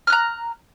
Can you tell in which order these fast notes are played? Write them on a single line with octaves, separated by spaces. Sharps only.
F6 F#6 A#5